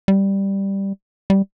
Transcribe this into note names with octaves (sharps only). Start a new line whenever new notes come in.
G3
G3